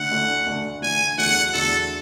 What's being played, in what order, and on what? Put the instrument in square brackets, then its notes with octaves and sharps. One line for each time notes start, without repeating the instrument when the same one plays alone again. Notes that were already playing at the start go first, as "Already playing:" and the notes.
Already playing: [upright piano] D2 D3 A3 D4 [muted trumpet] F#5
[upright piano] D2 D3 A3 D4
D2 D3 A3 D4
[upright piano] D2 D3 A3 D4 [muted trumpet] G#5
[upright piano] E2 D3 F#3 A3 [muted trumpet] F#5
[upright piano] E2 D3 F#3 A3 [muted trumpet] A4